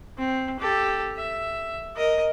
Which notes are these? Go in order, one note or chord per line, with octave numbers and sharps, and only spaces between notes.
C4
G4 A4
E5
A#4 D#5